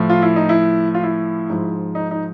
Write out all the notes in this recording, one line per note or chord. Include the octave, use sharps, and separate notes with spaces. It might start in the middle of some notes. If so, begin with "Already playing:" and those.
Already playing: A2 F3
F4
E4
D#4
E4
F4
E4
G#2 F3
D#4
D#4